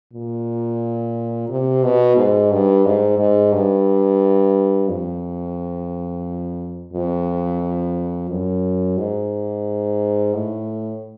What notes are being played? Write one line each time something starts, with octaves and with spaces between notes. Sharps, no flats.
A#2
C3
B2
G#2
G2
G#2
G#2
G2
F2
F2
F#2
G#2
A2